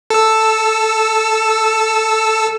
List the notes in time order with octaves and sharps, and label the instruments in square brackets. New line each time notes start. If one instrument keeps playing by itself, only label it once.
[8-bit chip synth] A4 E6